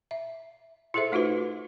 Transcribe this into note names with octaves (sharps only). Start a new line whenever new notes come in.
E5
E4 G#4 A4 C5 E5
A3 D#4 F4 F#4 B4